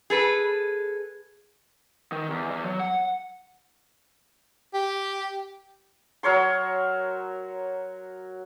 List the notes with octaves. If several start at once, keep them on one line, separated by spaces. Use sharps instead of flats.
G#4 A4 B4
D#3
E2
E2
F#3
F#5
G4
F#3 A#4 C#5 C6